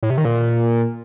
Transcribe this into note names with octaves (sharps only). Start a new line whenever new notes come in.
A2
C3
D#3
A#2